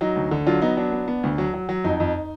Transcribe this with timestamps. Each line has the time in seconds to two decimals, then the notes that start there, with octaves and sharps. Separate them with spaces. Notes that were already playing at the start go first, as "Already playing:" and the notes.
0.01 F#3 D#4
0.16 D2
0.31 D3
0.46 F#3 D4 F4
0.62 B3 D#4
0.77 F#3 D4
0.92 B3
1.08 B3
1.23 D2
1.38 F#3
1.54 F#3
1.69 F#3
1.84 F2 D#4
2.00 F2